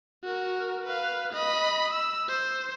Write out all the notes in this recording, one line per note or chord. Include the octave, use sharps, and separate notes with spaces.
F#4 A#4
B4 F5
D#5 B5
E6
C5